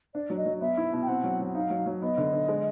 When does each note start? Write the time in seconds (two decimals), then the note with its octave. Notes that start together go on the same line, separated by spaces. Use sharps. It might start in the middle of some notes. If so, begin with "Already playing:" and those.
0.15 D4 D5
0.30 F#3
0.37 D#5
0.46 F#3
0.61 B3 E5
0.77 E4
0.93 B2
1.02 G5
1.08 C4 F#5
1.24 F#3
1.40 F#3
1.55 D#4 F5
1.70 F#3
1.86 F#3
2.02 B3 D#5
2.17 D3
2.33 D3
2.48 G#3